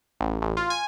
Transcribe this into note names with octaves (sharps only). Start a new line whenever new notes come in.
A1
A1
F4
G#5